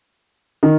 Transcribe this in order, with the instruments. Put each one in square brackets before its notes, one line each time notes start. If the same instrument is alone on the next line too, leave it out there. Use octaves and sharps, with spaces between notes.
[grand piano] D#3